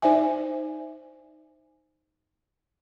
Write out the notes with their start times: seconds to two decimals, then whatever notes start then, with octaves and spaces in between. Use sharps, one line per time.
0.02 D#4 C5 D5 E5 G#5